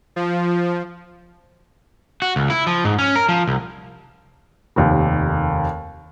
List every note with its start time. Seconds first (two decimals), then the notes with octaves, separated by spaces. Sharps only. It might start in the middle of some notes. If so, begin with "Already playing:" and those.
0.16 F3
2.22 F#4
2.36 C#2
2.50 E4
2.67 F3
2.85 G#2
2.98 C#4
3.16 A#4
3.29 F3
3.47 C2
4.76 F1 D#2 G4